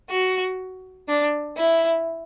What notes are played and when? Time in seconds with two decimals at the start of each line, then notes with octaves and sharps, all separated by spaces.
0.10 F#4
1.08 D4
1.57 E4